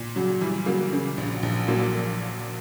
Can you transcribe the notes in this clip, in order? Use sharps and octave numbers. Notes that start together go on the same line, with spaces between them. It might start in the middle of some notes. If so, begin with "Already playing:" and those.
Already playing: A#2
C#3 F#3
E3 G3
C#3 F#3 A#3
C#3
A#1
A#1
A#2 F#3 A#3